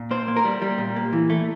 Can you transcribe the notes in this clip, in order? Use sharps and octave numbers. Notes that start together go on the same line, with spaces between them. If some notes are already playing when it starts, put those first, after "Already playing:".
Already playing: A#2
A#3 C5
A#3
A#4
G3
G3
A#2
A#3
E3
A3